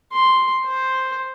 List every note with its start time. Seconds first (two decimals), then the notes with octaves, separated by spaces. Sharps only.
0.13 C6
0.65 C5